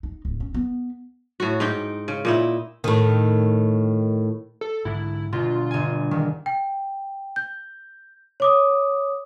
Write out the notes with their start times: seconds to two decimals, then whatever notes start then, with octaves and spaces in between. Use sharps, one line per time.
0.03 D#4
0.25 D1
0.40 C#4
0.54 B3
1.40 A2 F#4
1.60 G#2 D#4 G5
2.08 C#3
2.25 A#2 D#4 E4
2.84 A2 D#3
4.61 A4
4.85 G#2 D3 E4
5.33 G1 B2 F4
5.71 G1 G#5
6.11 E1 D#3
6.46 G5
7.36 G6
8.40 C#5 D6 D#6